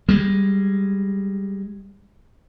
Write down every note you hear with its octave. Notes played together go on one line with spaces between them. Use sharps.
G3 G#3